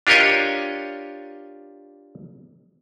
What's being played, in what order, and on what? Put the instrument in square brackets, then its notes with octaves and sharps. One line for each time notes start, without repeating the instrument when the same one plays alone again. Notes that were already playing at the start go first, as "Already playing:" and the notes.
[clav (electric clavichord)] D4 F4 G4 A#4 C#5 D#5